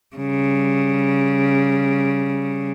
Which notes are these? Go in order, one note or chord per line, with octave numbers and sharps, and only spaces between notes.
C#3 G3